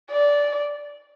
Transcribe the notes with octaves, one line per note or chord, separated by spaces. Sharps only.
D5